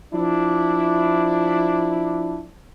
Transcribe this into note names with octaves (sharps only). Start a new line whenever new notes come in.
F3 D4 E4